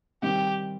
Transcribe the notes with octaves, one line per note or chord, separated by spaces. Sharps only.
D#3 G3 C4 G4